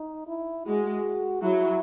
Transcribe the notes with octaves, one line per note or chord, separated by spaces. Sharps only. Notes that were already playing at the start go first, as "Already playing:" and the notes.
Already playing: D#4
E4
G#3 F#4
F#3 E4